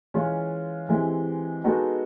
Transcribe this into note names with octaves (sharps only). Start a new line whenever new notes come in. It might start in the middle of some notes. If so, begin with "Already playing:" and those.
E3 G#3 C#4 F4
E3 G#3 C4 E4 G4
G#3 B3 D#4 F#4 A4